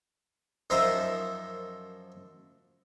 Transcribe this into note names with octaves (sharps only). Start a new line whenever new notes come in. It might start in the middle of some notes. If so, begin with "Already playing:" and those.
F#2 F3 D#4 A#4 C5 E5